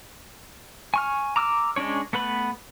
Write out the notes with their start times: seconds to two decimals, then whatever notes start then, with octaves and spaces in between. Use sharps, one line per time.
0.94 G#5 C#6 F6
1.36 A#5 D6 E6 F6
1.76 G#3 C#4 D4 C#5
2.13 A3 B3 B4 B5